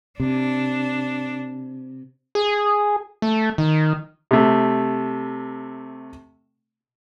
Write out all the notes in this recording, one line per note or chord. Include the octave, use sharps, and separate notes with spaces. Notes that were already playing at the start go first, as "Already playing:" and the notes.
C3 D4
G#4
A3
D#3
C3 A3